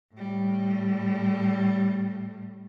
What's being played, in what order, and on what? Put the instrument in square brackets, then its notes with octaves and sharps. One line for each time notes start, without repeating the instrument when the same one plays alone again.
[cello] A2 G3